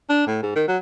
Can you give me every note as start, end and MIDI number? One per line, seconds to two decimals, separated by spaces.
0.09 0.26 62
0.27 0.40 45
0.43 0.54 44
0.55 0.63 51
0.68 0.77 54